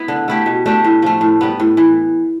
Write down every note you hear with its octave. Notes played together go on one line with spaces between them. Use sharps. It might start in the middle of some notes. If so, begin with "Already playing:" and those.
Already playing: B3 E4
D3
A3 E4 G4
B2
A3 D4 G4
A2
F3 A3
A2
G3 B3
A2
E3